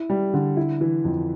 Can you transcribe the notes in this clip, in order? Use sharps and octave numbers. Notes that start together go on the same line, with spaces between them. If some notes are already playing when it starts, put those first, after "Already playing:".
Already playing: E4
G3
D3
E4
E3
F2